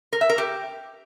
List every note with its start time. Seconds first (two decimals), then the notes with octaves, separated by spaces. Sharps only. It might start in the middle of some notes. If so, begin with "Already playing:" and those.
0.13 A#4
0.21 E5
0.30 A#4
0.38 G4